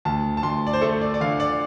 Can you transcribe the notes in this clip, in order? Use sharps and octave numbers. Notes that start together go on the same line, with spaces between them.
D2 A5
A5
D2 C6
D5
C5
A3 A4
D5
D5
D3 F5
D5